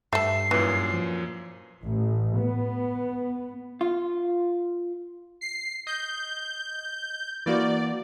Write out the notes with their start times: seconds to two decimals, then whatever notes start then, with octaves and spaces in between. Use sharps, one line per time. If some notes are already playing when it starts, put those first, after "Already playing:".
0.13 G2 A3 A4 E5 C7
0.51 F#2 A#2 E3
0.93 F3
1.84 A1
2.40 B3
3.81 F4
5.41 C7
5.87 D#5 G6
7.46 E3 A#3 F#4 D5